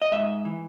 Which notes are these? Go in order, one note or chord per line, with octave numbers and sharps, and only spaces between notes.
D#5
G#2 E5
E3